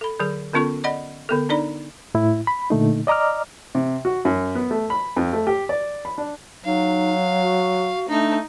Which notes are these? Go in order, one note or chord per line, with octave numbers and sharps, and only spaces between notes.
A4 B5
D3 F#3 G#4
D3 B3 C#4 F4 A4 C#6
D5 D#5 F#5 B5
D3 B3 A4
D4 D#4 D5 B5
A2 E4
B5
A#2 D3 A3 D#4
D5 D#5 A#5 D6 F6
C3
F#4
F#2
B3
A3
B5
F2
A3
G4
D5
B5
D4
F#3 D#4 F5
F#4
A3 D4 D#4